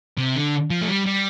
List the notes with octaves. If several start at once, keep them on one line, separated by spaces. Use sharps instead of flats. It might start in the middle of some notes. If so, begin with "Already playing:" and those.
C3
D3
F3
A3
G3
G3